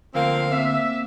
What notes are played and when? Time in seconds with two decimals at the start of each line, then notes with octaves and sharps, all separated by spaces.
0.15 D2 F3 A#3 C4 F5
0.52 A#3 C4 E5